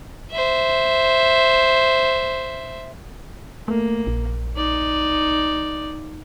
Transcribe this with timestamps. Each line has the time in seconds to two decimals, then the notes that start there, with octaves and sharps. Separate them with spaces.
0.31 C5 E5
3.68 A3 A#3
4.07 A#1
4.56 D#4 D5